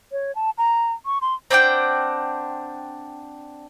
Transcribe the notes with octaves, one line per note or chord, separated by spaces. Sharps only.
C#5
A5
A#5
C#6
C6
C4 D4 F#5 G5